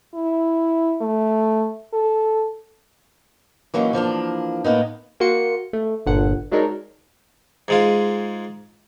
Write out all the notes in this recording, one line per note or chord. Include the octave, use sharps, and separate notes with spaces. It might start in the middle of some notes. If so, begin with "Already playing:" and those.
E4
A3
A4
E3 F#3 A#3 C#4 D#4
E3 F3 A#3 D4
A2 A#3 B3 D#4
A#3 F#4 C6 C#7
A3
G1 A#2 D3 F#5
F#3 G#3 D4 D#4 A#4 C#5
G#2 G#3 F4